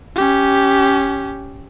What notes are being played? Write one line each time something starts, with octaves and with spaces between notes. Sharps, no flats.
C#4 G4